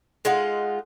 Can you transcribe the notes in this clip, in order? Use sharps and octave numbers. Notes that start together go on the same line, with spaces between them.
G#3 D#4 F4 F#5